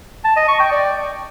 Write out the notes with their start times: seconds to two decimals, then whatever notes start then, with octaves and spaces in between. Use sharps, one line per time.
0.25 A5
0.36 D#5
0.48 C#6
0.60 G5
0.72 D5